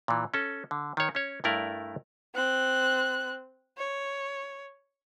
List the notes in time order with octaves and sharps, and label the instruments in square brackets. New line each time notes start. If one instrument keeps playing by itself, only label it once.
[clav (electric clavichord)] A#2 E3
C#4 A4
D3
D#3 C#5
C#4 C#5
G2 A3 E4 A#4 D5
[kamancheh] C4 F#6
C#5